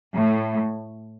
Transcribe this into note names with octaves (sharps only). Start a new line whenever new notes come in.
A2